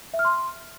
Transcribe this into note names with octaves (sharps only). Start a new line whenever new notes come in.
E5
F6
C6